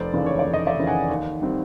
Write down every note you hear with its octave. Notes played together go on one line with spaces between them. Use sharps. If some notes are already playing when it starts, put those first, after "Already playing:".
Already playing: F1 C5 D5
D#2 C#3 E3
C#5
D5
F1
D#5
D5 E5
D#2 C#3 E3
F#5 G#5
D#2
D#3 G3 C4